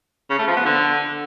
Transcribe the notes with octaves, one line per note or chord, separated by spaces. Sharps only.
C#3
A3
F3
B3
D3